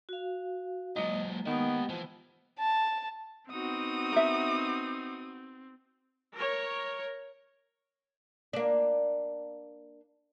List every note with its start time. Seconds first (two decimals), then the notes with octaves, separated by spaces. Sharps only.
0.09 F#4 F5
0.96 F#3 G#3 A#3 F4 D#5
1.46 D#3 B3 G4 D#5
1.89 E3 F3
2.59 A5
3.51 B3 C4 D#4 F#4 D#6
4.12 A#4 E5
6.36 A#4 C#5
8.53 A#3 D4